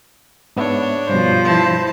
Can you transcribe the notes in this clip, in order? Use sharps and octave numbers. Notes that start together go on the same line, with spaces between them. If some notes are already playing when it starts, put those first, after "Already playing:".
G#2 B3 D4 C#5 E5
G2 B2 F3 C5
E4 A5